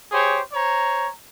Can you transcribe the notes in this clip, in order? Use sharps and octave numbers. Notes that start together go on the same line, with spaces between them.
G4 G#4 C5 C#5
C5 C#5 A#5